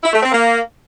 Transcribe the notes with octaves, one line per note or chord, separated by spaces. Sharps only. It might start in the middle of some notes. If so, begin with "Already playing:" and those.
E4
A3
C4
A#3